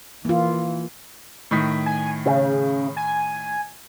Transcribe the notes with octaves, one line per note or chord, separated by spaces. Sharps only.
E3 A#3 F4
A2 D#3 B6
G#5
C#3
G#5